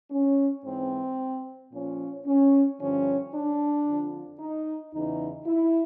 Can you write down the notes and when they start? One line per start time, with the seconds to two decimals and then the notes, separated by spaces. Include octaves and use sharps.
0.11 C#4
0.64 G#2 E3 C4
1.71 A#2 F3 C#4
2.26 C#4
2.79 G2 D3 F3 C#4
3.32 D4
3.86 F2 D3 F3
4.39 D#4
4.93 E2 C#3 E3 D#4
5.46 E4